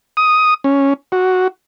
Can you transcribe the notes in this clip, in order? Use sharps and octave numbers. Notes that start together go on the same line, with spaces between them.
D#6
C#4
F#4